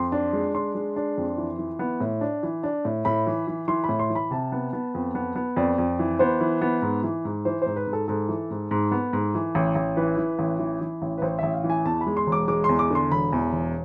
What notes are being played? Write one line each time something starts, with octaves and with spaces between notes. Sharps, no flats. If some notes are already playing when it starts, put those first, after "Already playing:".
Already playing: F2 C6
D4
G#3
D4 C6
G#3
D4
F2
E3
E3
B3
A2
D4
E3
D4
A2
A2 B5
E3
E3
E3 C6
B5
A2
C6
E3
B5
C3 A5
B3
B3
F2
B3
B3
F2 D5
F2
E3
B3 C5
E3
B3
G#2
E3
G#2
E3 C5
G#2 C5
B4
G#2
A4
G#2 A4
E3
G#2
G#2
B3
G#2
E3
A1
A1
E3 B4
E3
A1
E3
E3
A1
B4
A1 C5
A1 E5
F5
E3
G#5
E2 A5
B5
G#3
C6
E1
D6
G#3 D6
E2 C6
D6
D3 C6
E1 B5
E2
E1